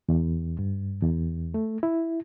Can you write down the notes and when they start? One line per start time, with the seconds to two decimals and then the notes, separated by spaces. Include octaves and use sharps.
0.09 E2
0.59 G2
1.02 E2
1.54 A3
1.83 E4